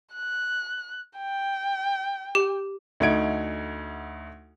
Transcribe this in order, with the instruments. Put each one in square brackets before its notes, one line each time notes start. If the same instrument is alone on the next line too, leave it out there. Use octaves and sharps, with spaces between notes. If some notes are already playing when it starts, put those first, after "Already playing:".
[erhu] F#6
G5
[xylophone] G4
[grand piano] D2 A3 D#4 F#5 G#6 D7